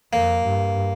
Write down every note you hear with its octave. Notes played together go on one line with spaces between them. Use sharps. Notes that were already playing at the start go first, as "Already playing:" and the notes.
F2 A#3
G2